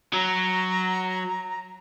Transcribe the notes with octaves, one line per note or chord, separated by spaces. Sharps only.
F#3 A#5